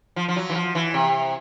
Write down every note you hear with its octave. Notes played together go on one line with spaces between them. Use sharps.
F3
F3
F#3
E3
F3
E3
C3